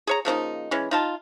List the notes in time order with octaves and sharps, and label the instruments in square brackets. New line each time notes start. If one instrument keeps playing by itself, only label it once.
[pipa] G#4 C#5 A#5
C#3 F3 A#3 D#4
E3 G#3 C#4
D#4 F4 A5